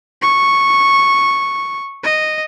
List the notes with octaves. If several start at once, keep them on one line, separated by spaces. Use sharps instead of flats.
C#6
D#5